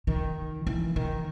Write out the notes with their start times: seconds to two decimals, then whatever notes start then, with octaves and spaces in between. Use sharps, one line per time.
0.07 D#3
0.67 E3
0.96 D#3